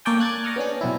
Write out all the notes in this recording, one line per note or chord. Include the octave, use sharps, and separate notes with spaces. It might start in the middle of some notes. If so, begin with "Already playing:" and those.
A#3 A4 C#5 D5 G5 G#5
D6 F#6 G#6 A6
D5 A#5 C#6 D#6 F6
B3 C#4 D4 G#4
B2 F#3 C4 E4